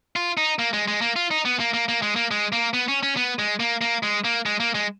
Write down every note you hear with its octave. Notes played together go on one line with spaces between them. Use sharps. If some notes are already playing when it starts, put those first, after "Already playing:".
F4
D#4
A#3
G#3
G#3
A#3
F4
D#4
B3
A#3
A#3
A#3
G#3
A#3
G#3
A#3
B3
C#4
C#4
B3
G#3
A#3
A#3
G#3
A#3
G#3
A#3
G#3